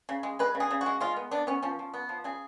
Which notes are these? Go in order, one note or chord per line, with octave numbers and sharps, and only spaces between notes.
C#3
G#3
G#3 B4
C#3
G#4
C#3
F#4
G#3
G#3 F4
B3
B3 D4
B3 C#4
F3 C#4
F3
B3
F3
C#3 G#4